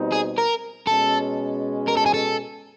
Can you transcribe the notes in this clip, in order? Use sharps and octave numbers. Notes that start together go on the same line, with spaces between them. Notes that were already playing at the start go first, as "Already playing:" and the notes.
Already playing: B2 G3 C4 D#4
G#4
A#4
B2 G#3 C#4 A4
A#4
A4
G#4
A4